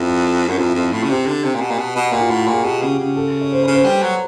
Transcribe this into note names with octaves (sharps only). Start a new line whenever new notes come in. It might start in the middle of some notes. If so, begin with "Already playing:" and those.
Already playing: F2 E4
F#2
F2 F4
E4
F2 F4
A2
C#3
C3 G4
D3
C3
A#2
B2
A#2
B2
B2
A#2 F#4
F4
A2 F#4
A#2
G#4
B2 G4
C#3
C#3
A4
C#5
C5
C#3 B4
C5
G3
F#3